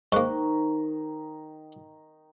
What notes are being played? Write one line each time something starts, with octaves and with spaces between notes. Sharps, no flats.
G#2 D#3 A#3 D#4 C5 C#6